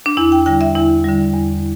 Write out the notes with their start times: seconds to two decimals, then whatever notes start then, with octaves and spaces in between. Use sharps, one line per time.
0.06 D4
0.17 E2 E4
0.32 G5
0.46 D3 G3 G5
0.61 E5
0.75 E2 E4
1.04 D3 G3
1.33 E2